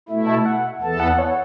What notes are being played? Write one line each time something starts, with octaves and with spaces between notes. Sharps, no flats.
B2 A3 E4 E5
A5
E5
F#5
E2 E3 B3 A4 A5
F#5
C#5